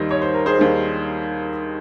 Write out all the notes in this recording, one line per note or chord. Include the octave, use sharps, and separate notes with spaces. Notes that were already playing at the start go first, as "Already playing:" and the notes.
Already playing: D#2 D#3 G3 C5 D#5
C#5
C5
A#4
G#4 C5
D#2 D#3 G3